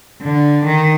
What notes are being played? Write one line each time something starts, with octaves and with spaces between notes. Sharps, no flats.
D3
D#3